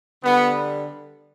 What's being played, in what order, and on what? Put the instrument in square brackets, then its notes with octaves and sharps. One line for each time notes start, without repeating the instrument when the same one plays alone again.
[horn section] D3 G3 B3